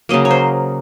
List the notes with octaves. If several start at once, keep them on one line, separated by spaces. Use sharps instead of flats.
C#3 F#3 A#3 D#5
C#5
C5